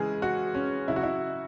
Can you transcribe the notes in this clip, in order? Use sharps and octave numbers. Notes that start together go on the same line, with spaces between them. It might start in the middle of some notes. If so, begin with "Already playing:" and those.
Already playing: C#3 E3 G#3 G#4
F#4
C#4
C#3 F#3 E4
F#4
E4